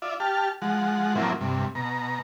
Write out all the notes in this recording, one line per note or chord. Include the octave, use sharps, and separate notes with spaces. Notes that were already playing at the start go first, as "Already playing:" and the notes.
F4 D5 E5
G4 A5 F6
F3 G#3 F#5
A2 F3 F#3 A#3 C4 E4
G2 C3
B2 A#5